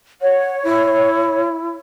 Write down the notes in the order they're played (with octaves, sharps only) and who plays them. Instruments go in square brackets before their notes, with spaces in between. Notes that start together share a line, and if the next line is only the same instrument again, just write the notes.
[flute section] C#5 [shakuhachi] F#5
[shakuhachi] E4